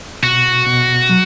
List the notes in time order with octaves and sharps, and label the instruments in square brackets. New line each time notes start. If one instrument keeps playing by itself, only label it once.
[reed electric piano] B2 [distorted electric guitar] F#4
[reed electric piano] B2
F#3